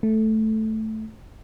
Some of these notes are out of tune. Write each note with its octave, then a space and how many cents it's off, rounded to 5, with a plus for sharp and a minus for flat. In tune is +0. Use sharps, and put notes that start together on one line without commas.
A3 -5